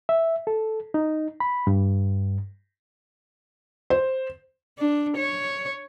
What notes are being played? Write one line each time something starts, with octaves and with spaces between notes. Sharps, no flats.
E5
A4
D#4
B5
G2
C5
D4
C#5